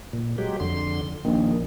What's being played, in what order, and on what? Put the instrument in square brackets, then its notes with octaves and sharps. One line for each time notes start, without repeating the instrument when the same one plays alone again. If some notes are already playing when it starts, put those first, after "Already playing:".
[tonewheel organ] A#2
F#3 G#3 G4
F2 D3 C6
[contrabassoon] A#1 [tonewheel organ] D#3